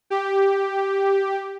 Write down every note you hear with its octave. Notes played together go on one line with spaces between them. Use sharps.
G4